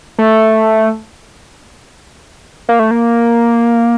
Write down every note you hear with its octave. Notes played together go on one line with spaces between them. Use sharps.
A3
A#3
A3
A#3